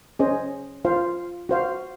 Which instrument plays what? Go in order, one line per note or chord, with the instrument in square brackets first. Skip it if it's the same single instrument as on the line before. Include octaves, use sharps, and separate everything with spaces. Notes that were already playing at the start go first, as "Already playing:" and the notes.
[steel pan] C#4 G#4 C5 D#5
F4 C5 F5
F#4 C5 F5